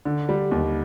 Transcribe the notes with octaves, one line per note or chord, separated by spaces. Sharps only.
D3
G3
D#2